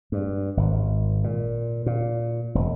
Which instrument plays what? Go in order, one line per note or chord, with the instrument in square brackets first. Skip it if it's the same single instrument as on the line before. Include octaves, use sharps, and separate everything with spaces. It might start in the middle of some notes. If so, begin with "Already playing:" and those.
[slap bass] G2
G#1
A#2
A#2
E1